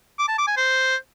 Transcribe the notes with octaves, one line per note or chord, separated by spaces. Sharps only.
D6
A5
D6
G#5
C5